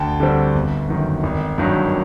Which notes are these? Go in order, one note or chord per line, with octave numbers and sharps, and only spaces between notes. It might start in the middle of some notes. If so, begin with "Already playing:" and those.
Already playing: D2 G5 A5
D3 G3 C4
G1
F#2 D#3
G#1
G2 D#3 F#3